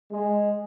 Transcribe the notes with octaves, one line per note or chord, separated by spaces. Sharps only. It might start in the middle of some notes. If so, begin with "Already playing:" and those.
G#3